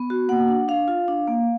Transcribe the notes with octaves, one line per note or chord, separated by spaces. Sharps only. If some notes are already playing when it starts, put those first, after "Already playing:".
Already playing: B3
F#4
A#3 F#5
D4
D4 F5
F4
D4
A#3